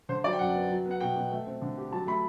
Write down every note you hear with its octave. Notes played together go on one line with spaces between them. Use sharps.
D3 C5
F#3 D5
G5
F#2 F#5
B3
F#3
B3
F#5
B2 G5
B2
A3
C4
D3
G4
F#3 A5
A3 B5